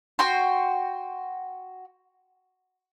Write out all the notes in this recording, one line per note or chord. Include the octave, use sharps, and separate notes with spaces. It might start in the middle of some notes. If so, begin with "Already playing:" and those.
F#4 G5 C6